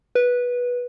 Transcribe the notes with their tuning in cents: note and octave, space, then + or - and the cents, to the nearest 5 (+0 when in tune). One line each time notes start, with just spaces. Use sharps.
B4 -15